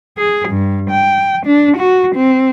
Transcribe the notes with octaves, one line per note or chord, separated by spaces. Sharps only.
G#4
G2
G5
D4
F#4
C4